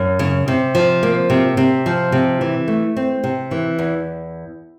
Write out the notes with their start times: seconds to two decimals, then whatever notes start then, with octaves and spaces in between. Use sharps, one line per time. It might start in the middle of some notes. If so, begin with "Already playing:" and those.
Already playing: F#2
0.19 C#3
0.48 C3
0.75 F3
1.03 A#3
1.30 C3
1.57 C3
1.86 F3
2.12 C3
2.41 E3
2.68 A3
2.97 C4
3.24 C3
3.51 E3
3.79 E2